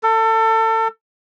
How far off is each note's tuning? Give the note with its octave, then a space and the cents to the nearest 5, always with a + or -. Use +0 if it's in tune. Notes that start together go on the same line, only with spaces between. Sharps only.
A4 +30